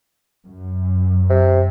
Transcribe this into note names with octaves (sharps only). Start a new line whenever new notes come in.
F#2
C3